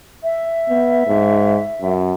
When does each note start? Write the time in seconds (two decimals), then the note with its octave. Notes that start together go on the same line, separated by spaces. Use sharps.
0.23 E5
0.69 B3
1.07 G#2
1.82 F#2